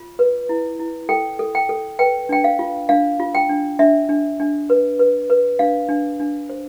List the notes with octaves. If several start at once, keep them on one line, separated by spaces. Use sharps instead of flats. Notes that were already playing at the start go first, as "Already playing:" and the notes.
Already playing: F4
B4
E4
E4
A4 G5
A4
G5
A4
B4 G5
D4 G5
F5
F4
D4 F5
F4
G5
D4
D4 E5
D4
D4
B4
B4
B4
D4 F5
D4
D4
C5